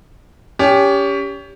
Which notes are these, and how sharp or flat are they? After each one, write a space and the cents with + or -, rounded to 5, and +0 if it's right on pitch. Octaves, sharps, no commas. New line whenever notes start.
C#4 +30 G4 +15